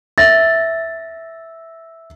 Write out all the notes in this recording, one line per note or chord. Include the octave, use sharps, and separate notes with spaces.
E5 A6 A#6